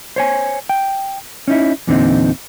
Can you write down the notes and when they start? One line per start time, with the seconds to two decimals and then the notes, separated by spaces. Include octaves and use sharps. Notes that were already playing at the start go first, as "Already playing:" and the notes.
0.16 C5 C#5 G#5
0.69 G5
1.48 C#4 D#4 E4
1.87 E2 A#2 D3 G3 C4 D#4